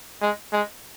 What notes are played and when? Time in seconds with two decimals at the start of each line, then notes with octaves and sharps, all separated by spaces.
0.22 G#3
0.53 G#3